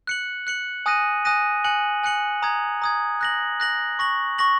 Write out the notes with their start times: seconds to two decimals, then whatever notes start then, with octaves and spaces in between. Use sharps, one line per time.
0.07 F#6 C#7 F#7
0.47 F#6 C#7 F#7
0.86 G#5 D#6 F#6 A#6 D#7
1.25 G#5 D#6 F#6 A#6 D#7
1.64 G#5 F#6 C#7 F#7
2.03 G#5 F#6 C#7 F#7
2.42 A#5 D#6 G#6
2.82 A#5 D#6 G#6
3.21 F#6 A#6 F#7
3.60 F#6 A#6 F#7
3.99 C#6 A#6 F#7
4.38 C#6 A#6 F#7